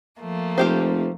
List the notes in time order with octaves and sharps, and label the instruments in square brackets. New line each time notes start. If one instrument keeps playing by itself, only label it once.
[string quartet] F3 A3 A#3
[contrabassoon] F1 [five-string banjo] F4 G4 C5